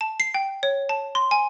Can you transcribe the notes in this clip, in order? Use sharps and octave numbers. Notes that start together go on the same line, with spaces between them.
A5
C7
G5
C#5
A5
C6
G#5